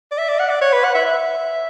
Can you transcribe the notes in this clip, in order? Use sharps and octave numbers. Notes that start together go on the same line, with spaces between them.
D5
E5
D5
F#5
D5
C#5
B4
F#5
E5
E5